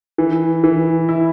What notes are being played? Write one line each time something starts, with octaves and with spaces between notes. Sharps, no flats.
E3
E3
E4